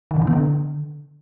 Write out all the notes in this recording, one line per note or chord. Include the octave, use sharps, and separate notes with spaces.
D#3
C#3
E3
B3
D3